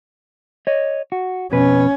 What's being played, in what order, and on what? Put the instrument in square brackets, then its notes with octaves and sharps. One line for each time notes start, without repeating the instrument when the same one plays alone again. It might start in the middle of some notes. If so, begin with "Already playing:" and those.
[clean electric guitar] C#5 D#5
F#4
[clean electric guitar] F2 B2 B4 [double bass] C#4